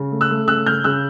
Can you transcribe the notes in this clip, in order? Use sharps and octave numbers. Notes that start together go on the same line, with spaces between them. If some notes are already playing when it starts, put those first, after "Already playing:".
Already playing: C#3
A3
E6 F#6
A3
C#3 E6 F#6
C#3 F6 G6
C#3 E6 F#6